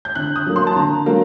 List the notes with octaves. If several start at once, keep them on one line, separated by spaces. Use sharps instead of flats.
G6
D3 F#6
D#6
F#3 A#3
C6
A5
D3 A#5
F#3 A#3